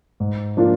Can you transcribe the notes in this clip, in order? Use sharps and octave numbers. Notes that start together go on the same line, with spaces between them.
G#2
F3 A#3 D4 F4